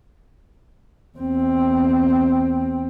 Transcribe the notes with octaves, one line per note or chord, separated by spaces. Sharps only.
E2 C4